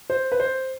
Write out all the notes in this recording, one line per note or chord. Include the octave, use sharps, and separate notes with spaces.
C5
B4
C5